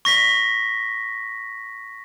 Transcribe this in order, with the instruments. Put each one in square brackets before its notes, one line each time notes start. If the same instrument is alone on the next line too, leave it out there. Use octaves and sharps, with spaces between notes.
[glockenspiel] C#6 A#6 B6